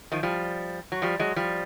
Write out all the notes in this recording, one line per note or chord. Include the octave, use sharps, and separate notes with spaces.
D#3 F3
F3 G3
F#3
F3 G3
F#3 G#3
F3 G3